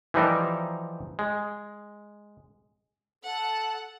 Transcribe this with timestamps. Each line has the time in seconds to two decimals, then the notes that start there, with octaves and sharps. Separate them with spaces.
0.14 E3 F3 G3 D#4 A#4 C5
1.19 G#3
3.23 A4 F#5